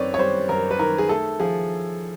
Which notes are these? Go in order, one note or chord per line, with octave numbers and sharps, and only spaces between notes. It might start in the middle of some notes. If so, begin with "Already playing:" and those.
Already playing: F#2 D#3 C4 B4 C#5 D5
C#5
G3 C5
F#2 A#4
B4
D#3 A#4
G#4
A3 A4
F3 G#4